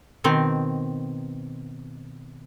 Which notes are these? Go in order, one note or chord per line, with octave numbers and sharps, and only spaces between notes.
B2 D#3 C4